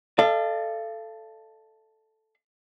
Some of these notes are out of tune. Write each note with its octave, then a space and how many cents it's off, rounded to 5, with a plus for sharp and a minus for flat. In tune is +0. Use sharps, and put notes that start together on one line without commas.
A4 +0 D5 +45 F5 -35